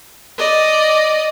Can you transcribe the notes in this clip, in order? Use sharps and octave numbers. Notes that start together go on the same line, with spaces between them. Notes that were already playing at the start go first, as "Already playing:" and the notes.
D5 D#5